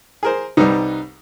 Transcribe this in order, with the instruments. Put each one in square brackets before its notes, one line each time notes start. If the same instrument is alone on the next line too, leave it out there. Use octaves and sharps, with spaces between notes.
[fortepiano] G#4 A#4 C5
[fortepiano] C2 G3 [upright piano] D#4 B4